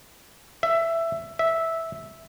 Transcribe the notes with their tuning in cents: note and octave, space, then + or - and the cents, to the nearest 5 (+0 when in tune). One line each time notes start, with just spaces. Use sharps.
E5 +10
E5 -10